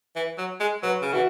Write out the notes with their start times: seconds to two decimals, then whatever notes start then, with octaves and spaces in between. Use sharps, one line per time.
0.16 E3
0.38 F#3
0.60 G#3
0.83 F#3 B4
1.02 C#3
1.13 E3 F#4